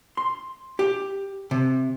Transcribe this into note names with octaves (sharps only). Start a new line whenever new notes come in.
C6
G4
C3